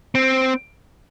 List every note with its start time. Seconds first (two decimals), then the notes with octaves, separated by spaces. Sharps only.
0.15 C4